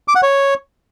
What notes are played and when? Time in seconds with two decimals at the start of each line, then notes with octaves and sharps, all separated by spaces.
0.08 D6
0.15 F#5
0.23 C#5